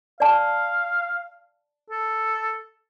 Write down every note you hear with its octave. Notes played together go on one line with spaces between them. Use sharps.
D5 F5 A5
A4